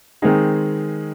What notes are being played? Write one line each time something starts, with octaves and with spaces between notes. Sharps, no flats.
D#3 G#3 C4 D#4 G#4